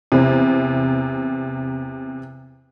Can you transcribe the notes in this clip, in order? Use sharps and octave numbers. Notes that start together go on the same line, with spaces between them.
E2 C3